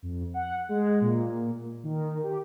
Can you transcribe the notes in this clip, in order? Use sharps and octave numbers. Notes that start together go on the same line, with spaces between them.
F2
F#5
G#3
A#2
D#3
G4